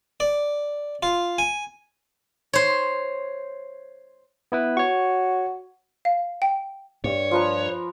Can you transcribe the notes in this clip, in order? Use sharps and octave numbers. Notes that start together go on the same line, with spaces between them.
D5
F4
G#5
C5 C#5
B3 E4 B4
F#4 C#5 C#6
F5
G5
G2 C#5
F3 B4 A#5